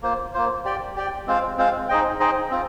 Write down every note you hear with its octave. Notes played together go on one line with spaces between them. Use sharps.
A#3 F4 C5
A#3 F4 C5
G4 D5 G5
G4 D5 G5
G#3 C4 F4 C5 F5
G#3 C4 F4 C5 F5
D#4 G#4 C5 D#5 G5
D#4 G#4 C5 D#5 G5
C4 F4